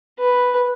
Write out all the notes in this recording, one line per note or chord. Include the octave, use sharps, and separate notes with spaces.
B4